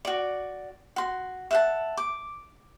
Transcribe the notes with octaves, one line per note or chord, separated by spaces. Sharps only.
F#4 D5
F#4 C6
E5 F#5 A5
D6